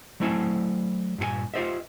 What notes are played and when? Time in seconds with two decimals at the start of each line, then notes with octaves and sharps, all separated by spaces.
0.20 F#3 A3 C4 E4 G#5 A5
1.18 G2 A#2 F4 G#5
1.54 F4 G4 C5 D#5 E5